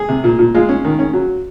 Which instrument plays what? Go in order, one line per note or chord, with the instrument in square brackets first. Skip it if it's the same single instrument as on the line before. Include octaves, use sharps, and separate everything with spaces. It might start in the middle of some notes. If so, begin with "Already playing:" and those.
Already playing: [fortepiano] G#4
C3
A#2
A#2
G#3 F4
C#4
D#3
C#4
F#3